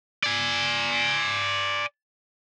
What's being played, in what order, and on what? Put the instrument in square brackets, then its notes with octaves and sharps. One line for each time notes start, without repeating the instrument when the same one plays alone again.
[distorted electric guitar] D5 G#5